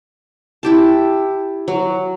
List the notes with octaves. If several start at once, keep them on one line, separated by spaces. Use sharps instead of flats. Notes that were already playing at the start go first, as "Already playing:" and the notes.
E4 G4 A5
F#3